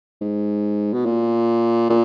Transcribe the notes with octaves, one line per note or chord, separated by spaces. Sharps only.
G#2
B2
A#2
A#2